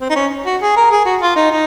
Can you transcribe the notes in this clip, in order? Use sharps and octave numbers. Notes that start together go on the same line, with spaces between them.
C4
D#4
C#4
F#4
G#4
A#4
G#4
F#4
F4
D#4
D#4